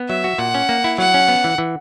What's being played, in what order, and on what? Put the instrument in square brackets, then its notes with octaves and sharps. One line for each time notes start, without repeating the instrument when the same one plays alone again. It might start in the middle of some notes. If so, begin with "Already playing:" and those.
Already playing: [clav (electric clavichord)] B3
[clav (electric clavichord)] F#3 [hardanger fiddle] E5
[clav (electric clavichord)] F#4
[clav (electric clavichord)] A#2 [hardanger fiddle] F#5
[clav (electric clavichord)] C#4
A#3
E4
[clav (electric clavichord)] F#3 [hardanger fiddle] F#5
[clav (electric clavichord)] C#4
B3
E3
E3